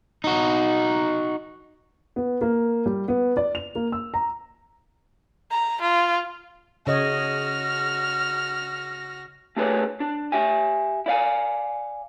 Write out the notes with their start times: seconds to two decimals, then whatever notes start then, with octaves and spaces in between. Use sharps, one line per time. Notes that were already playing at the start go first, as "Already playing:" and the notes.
0.24 D#4 F#4
2.16 B3
2.41 A#3
2.86 G3
3.08 B3
3.37 D5
3.55 F7
3.75 A#3
3.92 E6
4.14 A#5
5.51 A#5
5.81 F4
6.87 C#3 F#4 C#5 D#5 F6 A#6
9.57 A3 D4 G4 G#4 B4 C#5
10.00 D4
10.32 G4 E5 G#5
11.06 E4 D5 F5 G#5